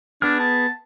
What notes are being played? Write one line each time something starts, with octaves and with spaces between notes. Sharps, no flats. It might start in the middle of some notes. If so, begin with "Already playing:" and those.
B3 D4 G#4 F6
A5